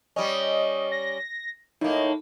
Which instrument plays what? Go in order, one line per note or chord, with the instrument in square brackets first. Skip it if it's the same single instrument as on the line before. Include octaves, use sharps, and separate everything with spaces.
[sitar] G3 C#4 [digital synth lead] D#5
[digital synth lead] A#6
[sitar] A2 A#3 [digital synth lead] D#4